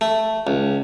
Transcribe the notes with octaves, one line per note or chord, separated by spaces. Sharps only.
A3
C#2